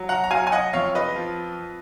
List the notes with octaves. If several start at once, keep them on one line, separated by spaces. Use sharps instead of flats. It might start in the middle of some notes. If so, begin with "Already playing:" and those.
Already playing: F#3
F#5 A#5
A#5
F#3 F5 G#5
G#5
D#5 F#5
F2 C#5 F5
B4 D#5
F3